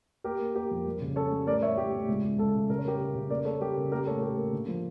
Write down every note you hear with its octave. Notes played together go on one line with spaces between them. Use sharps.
A#3 G4 A#4
A#3
A#3 G4 A#4
F2
G3
C#3
C#4 A4 C#5
G3
A2 A#4 D5
A3 C#5 E5
A2 G4
A2
C#2
C#2
C#2 A4
C#3
C#3 A#4
C#5
G3 G4 A#4
C#3
C#3
A#3 A#4 D5
A#3 A4 C#5
G3 G4 A#4
C#3
A#3 G4 A#4
A2 A4 C#5
A#3 G4 A#4
A#3
D3
F3